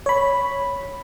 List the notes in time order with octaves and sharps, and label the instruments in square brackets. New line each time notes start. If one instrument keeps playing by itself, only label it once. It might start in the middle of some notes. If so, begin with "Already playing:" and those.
[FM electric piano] C#5 B5